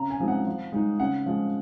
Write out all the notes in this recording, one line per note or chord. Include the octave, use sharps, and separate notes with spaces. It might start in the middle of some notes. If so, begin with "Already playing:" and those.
Already playing: C#3 A#5
G#5
F3 G#3 C4 D#4
F#5
F3
G#3 D#4
C#3 F#5
F3 G#3